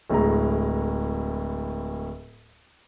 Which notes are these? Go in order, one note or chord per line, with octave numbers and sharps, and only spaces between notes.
D1 A2 G#3 A#5